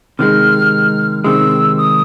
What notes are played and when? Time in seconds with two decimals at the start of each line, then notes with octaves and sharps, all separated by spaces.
0.19 C3 D#3 G#3 F6
1.24 C3 D#3 G#3 E6
1.78 D#6